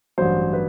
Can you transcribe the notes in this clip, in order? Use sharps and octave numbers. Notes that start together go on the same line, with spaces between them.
A1 G2 F#3 C5
B4